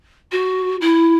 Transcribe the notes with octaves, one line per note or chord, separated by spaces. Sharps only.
F#4
E4